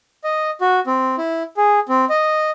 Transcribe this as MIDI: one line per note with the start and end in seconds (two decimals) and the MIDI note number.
0.24 0.50 75
0.61 0.80 66
0.87 1.16 60
1.18 1.43 64
1.57 1.79 68
1.89 2.05 60
2.09 2.51 75